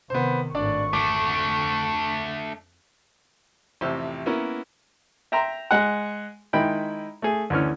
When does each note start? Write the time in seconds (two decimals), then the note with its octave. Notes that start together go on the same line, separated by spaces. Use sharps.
0.10 C3 D#3 B3 C5
0.55 G#1 A2 D4 D5 C#6
0.93 F2 A3 D4 D6
3.81 A1 F2 C3 G4 C5 E6
4.26 A#3 B3 C#4 E4 A#4 C#5
5.32 E5 G5 A#5 C6
5.71 G#3 G#4 F#5
6.53 D#3 G#3 E4 G5 B5
7.22 A3 G#4
7.50 D2 E3 C#4 F6